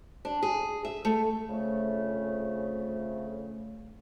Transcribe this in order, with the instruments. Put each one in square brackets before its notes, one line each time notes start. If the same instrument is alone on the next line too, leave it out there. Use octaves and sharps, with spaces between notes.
[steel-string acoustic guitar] D4
G#4
E5
A3
[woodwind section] F2 C#3 A3